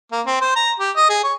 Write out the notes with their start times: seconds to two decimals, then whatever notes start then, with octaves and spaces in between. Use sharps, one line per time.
0.12 A#3
0.26 C4
0.41 C5
0.55 A#5
0.79 G4
0.96 D#5
1.09 G#4
1.24 C#5